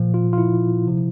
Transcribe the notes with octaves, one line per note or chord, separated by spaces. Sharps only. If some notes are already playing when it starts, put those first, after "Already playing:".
Already playing: A#2 F3
F4
F4
E4
C3 F3